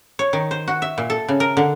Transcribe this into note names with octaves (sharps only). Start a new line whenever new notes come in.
C#5
D#3
C5
F#4
E5
A#2
A4
C#3
A#4
D3